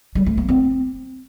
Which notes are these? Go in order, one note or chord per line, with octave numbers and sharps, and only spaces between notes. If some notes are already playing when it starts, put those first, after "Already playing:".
G3
A3
A#3
C4